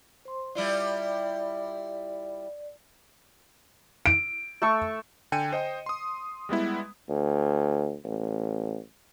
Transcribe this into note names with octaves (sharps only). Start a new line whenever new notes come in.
C5 C6
G3 E4 F4 D5
D7
A3 A4 C#6
D3 G5 G#5 C#7 D#7
C5 D#5 G5
C6 D#6
G3 G#3 B3 E4
D2
A1